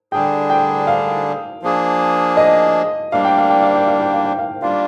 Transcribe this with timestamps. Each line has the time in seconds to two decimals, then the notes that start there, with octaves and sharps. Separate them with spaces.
0.12 D3 G3 D4 G#4 G5
0.50 G5
0.87 F5
1.62 F3 A#3 D4 G#4
2.37 D#5
3.12 G3 A#3 D4 F5
3.25 G5
3.38 F5
3.50 G5
3.63 F5
3.76 G5
3.88 F5
4.01 G5
4.13 F5
4.26 G5
4.39 F5
4.62 G3 A#3 D4 F4 F5